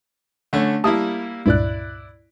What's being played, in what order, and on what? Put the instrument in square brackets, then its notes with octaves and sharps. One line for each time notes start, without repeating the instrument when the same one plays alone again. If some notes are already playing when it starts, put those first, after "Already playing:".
[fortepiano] D3 A3 C#4
[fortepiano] G3 A#3 E4 [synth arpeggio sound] A5 D#6
[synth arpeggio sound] C#2 G2 A#2 [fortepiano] E4 D5 F#6